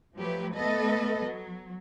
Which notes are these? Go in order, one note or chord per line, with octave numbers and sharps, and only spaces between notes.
F3 F#3 A3 G4 B4
A3 B3 A4 B4 D#5
F#3